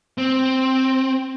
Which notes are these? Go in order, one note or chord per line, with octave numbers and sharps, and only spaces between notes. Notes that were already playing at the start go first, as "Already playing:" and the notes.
C4